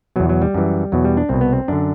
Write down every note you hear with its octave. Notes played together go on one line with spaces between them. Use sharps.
E2 B2 F#3
F#3
G3
F#2 E3
E2 B2 F#3
G3
D4
C2 B2 C4
B3
C4
F#2 D3 D4